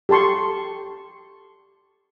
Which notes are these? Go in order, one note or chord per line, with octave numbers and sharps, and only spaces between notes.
G4 A4 A5 C6 C#6